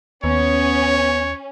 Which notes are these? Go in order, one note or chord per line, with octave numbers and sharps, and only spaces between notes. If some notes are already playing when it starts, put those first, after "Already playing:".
D#2 B3 C#4 C#5